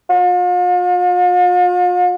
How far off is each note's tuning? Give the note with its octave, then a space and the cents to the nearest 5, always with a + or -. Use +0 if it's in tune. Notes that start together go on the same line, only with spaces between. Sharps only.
F4 +45